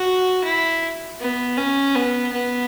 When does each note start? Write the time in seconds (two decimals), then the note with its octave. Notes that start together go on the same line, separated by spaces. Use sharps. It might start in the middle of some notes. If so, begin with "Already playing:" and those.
Already playing: F#4
0.45 E4
1.20 B3
1.57 C#4
1.95 B3
2.32 B3